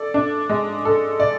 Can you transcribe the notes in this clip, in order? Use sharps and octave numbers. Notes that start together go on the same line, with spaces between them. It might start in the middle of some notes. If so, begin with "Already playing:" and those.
Already playing: A4 D5
D4
G#3
A4
D5